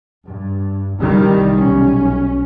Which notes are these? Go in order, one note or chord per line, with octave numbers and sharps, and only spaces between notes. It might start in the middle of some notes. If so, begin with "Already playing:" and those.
G2
C2 D#3 G3
B1 C#4